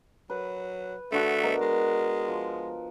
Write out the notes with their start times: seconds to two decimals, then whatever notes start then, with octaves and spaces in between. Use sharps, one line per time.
0.30 F#3 B4
1.12 D3 A3 F#4
1.43 B3 A#4 D#5
1.61 G#3
2.28 F3